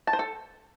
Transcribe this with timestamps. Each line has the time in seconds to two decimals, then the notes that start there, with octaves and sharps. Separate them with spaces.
0.07 A5
0.13 C5
0.19 A4